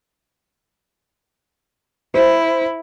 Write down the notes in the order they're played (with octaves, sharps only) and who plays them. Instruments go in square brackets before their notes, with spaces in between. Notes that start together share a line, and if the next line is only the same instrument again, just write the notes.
[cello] E4 [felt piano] C5